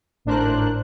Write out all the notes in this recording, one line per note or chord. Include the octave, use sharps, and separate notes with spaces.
G#1 A2 D4 A#4 C5 F#6